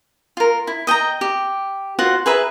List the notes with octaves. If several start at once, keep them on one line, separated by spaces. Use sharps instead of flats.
F4 A#4
E4
D#5 G5 A5 A#5
G4
F4 F#4 C5 F#5
G#4 B4 E5 A#5